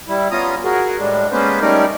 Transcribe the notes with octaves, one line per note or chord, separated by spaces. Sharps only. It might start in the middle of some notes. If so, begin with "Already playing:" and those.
G3 E4
B3 C#4 F4 A#5 D#6
F#4 G#4 A#4
A2 G3 G#3 D4
G#3 A#3 B3 C#4 B4 C5
G3 A3 C#4 D#4 A#4 D5